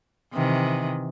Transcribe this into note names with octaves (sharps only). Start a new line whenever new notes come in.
C3 D#3 E3